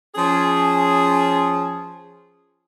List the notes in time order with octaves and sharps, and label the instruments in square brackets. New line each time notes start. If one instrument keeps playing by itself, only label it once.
[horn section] F3 C#4 G#4